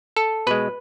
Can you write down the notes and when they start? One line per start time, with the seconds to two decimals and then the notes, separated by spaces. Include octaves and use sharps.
0.16 A4
0.47 B2 G#3 B4